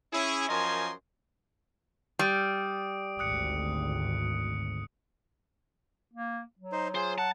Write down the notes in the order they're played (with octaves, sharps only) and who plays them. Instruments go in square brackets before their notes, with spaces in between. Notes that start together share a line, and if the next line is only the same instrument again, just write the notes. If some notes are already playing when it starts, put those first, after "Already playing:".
[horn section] C#4 E4 G#4
F#2 F3 A#4 D#5 G#5 C6
[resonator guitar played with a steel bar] G3 [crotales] D#6 D7
[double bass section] G#1 D2 [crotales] D#6 F#6 C#7
[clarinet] A#3
F#3
[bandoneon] D#4 C5
[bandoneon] F4 G#4 [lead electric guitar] C5
[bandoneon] F#5 [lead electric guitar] A5